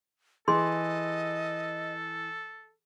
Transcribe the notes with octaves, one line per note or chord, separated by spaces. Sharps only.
E3 G#4 A4 D#5 C6